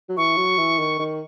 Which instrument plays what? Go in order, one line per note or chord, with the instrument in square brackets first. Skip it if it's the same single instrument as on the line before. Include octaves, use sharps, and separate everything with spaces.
[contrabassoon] F#3
[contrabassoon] E3 [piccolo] C#6
[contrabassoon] F#3
E3
D#3
D#3